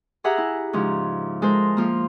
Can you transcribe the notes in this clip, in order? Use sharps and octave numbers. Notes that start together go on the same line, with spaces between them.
G4 G#4 E5 F#5 A#5
E4
G#2 C#3 F3
G#3 A4 A#4 C5
F3 A#3